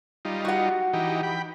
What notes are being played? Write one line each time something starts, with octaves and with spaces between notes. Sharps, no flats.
G3 D#4 F4
F#4 F#5
E3 D#4 G4
G5 B5